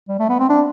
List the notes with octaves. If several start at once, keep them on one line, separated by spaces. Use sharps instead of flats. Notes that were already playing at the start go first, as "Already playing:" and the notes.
G3
A3
B3
C4
D4